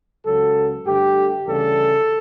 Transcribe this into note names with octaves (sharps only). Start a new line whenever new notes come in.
C#2 C#3 F#3 A4
G2 D3 A3 G4
D2 C#3 E3 G3 A4